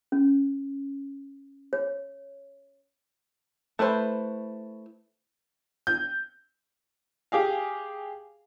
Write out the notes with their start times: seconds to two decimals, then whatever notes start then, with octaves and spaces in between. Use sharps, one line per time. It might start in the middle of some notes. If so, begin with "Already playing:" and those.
0.12 C#4
1.73 C#5
3.79 A3 E4 B4 C5
5.87 G6
7.32 G4 G#4 F5